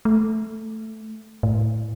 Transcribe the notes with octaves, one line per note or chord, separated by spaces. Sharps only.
A3
A2